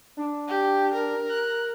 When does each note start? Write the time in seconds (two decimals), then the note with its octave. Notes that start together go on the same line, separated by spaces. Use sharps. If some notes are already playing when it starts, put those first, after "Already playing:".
0.17 D4
0.48 G4
0.93 A#4
1.29 F#6